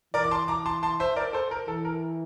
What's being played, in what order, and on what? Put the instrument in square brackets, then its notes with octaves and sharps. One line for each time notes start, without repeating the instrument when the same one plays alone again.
[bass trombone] E3 [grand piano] A#4 D5
[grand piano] D6
A5 C6
A#5 D6
A5 C6
A5 C6
C5 E5
A#4 D5
A4 C5
A#4
[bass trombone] E3 [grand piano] A4
[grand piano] A#4